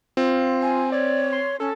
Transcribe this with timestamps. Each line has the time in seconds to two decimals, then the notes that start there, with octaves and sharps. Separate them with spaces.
0.17 C4 F4
0.62 G#5
0.92 C#5 D5
1.33 C6
1.60 C#4 A4